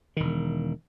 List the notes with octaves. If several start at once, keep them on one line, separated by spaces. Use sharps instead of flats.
E1 D#3